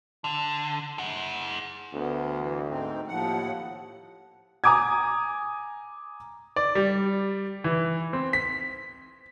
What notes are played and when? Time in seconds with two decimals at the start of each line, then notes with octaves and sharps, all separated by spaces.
0.24 D3
0.98 G#4 F#5
1.93 D2 B3
2.39 E3
2.69 G#2 C4 D#4
3.08 D#2 A2 F3 F#5
4.64 G#5 A#5 D6 D#6 G#6
6.56 D5
6.75 G3
7.64 E3
8.13 C4
8.33 B6